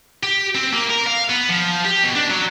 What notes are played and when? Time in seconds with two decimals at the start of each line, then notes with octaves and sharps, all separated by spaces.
0.23 G4
0.55 C4
0.73 A#3
0.90 A#4
1.07 F5
1.30 B3
1.49 F3
1.85 G4
2.04 B2
2.16 D4
2.30 F#3